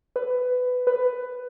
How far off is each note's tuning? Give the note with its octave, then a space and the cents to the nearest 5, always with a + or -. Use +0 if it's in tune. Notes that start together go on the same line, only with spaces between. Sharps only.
B4 +15
B4 +10